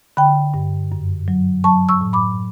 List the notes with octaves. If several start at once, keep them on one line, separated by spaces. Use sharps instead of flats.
D3 G5 B5
G2
F#2
F#3
F#3 A5 C#6
C#6 E6
A2
B5 D6